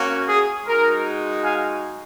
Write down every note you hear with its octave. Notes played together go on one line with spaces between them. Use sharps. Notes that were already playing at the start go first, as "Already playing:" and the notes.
Already playing: A#3 C#4 F#4
G#4
G#3 D#4 F#4 A#4
F5 G#5